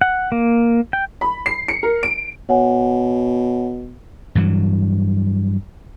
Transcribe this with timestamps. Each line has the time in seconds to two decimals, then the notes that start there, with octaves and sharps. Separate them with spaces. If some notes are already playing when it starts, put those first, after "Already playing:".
0.01 F#5
0.32 A#3
0.93 G5
1.21 B5
1.46 C7
1.68 C#7
1.83 A#4
2.03 D7
2.49 B2 C#5 F#5 G#5
4.35 G2 E3 F#3